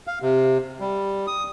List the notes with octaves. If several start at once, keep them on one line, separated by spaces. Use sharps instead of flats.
F5
C3
G3
D#6